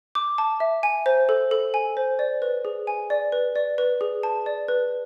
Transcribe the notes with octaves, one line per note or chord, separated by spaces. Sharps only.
D6
A5
E5
G#5
C5
A4
A4
G#5
C5
D5
B4
G#4
G#5
D5
B4
D5
B4
G#4
A5
D5
B4